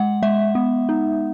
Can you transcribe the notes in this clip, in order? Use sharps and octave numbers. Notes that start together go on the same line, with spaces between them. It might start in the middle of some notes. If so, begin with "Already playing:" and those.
Already playing: G#3 F#5
G#3 E5
B3
D#4